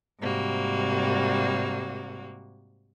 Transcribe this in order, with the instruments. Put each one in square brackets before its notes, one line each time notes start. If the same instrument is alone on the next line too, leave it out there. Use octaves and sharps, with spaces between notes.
[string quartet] G#2 C3 G3 A#3 F#4